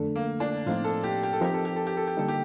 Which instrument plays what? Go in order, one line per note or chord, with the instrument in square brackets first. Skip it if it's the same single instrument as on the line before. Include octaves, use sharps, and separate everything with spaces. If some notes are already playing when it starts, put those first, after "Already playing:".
Already playing: [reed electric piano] F2 D3 A3 D4 A4
[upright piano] A#3
D4
[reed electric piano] A2 F3 C4 D#4 [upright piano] F4
[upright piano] A4
G4
G4
A4
[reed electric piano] F3 C4 D#4 A#4 [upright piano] G4
[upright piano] A4
G4
A4
G4
A4
G4
[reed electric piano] D3 G3 A#3 D#4 [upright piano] A4
[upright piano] G4